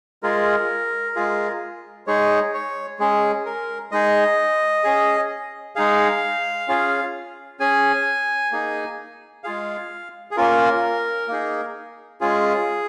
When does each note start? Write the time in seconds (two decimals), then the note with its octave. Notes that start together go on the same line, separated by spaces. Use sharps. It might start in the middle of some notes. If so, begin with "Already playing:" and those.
0.23 G#3 F4 G#4 A#4
1.16 G#3 F4 G#4
2.07 G#3 D#4 G#4 C#5
2.54 C#5
2.99 G#3 C#4 G#4
3.46 A#4
3.92 G#3 D#4 G#4 D#5
4.84 C#4 G#4
5.76 G#3 D#4 G#4 F5
6.68 C#4 F4 G#4
7.60 C#4 G#4 G#5
8.52 A#3 D#4 G#4
9.44 G#3 F4 G#4 F5
10.31 G#4
10.37 A#3 C#4 F4 A#4
11.28 A#3 D#4 G#4
12.21 G#3 C#4 F4 G#4